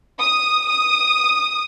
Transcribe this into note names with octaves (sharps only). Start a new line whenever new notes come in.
D#6
D#6